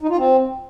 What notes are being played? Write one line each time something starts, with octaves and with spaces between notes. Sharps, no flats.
D#4
F4
C4